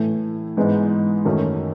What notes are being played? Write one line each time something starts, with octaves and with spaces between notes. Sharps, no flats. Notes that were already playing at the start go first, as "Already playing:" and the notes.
Already playing: A2 E3 A3
G#2 E3 G#3 B3 D#4
F#2 D#3 F#3 A3 C#4